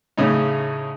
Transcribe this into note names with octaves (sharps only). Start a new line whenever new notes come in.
A2 C#3 C#4 D#4